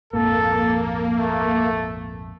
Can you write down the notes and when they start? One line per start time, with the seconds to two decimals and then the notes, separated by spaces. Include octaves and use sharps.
0.13 A#1 F2 G#2 A#3 A4
1.16 A3